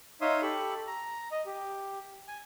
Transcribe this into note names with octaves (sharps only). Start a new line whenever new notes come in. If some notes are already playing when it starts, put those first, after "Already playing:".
D#4 C#5 E5 F5 C6 D#6
G4 A4 B5 C#6
A#5
D#5
G4
G#5